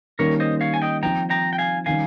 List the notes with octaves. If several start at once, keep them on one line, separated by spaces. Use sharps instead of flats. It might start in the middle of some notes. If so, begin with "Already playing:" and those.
D#3 G3 A#3 C#4 A#4 C#5
C5 D#5
C#5 F5
G#5
D#5 G5
F3 C4 D#4 G5 A#5
G5 A#5
G5
F5 G#5
D#3 G3 C#4 F5 G#5